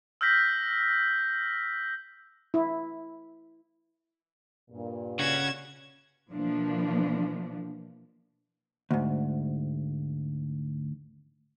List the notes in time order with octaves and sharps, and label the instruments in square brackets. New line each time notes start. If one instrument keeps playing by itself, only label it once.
[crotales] E6 F6 G6 A#6 B6
[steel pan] E4
[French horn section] G2 A#2
[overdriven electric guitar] C#3 C#4 [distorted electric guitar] F#4 [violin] G#6 E7
[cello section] B2 E3 F3 A#3 D4
[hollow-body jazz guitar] D2 G#2